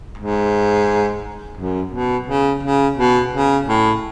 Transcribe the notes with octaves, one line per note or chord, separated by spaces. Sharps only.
G#2
F#2
B2
C#3
C#3
B2
C#3
A2